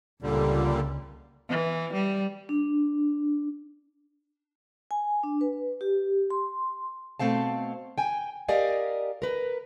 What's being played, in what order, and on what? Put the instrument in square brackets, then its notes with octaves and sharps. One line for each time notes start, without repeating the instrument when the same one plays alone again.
[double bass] C#2 [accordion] A#2 D3 G3
[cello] E3
G3
[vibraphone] D4
G#5
D4
B4
G4
C6
[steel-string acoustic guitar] B2 A3 C4 F5 A5
G5 G#5
G4 A#4 D5 D#5 F5 G#5
A#4 B4